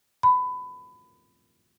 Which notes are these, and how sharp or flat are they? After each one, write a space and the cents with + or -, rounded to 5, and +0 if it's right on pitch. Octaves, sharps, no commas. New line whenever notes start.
B5 +20